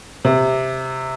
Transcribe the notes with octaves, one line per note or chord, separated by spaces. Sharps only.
C3